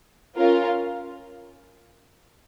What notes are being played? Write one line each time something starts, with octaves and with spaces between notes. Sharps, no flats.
C#4 F4 A#4